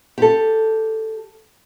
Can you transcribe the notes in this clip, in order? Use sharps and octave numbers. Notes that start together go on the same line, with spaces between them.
G4 A4